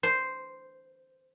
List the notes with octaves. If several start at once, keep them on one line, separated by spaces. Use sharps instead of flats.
C5